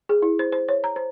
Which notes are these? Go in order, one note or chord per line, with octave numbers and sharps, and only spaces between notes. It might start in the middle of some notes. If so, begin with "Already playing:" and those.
G#4
E4
C5
C5
C#5
A#5
C5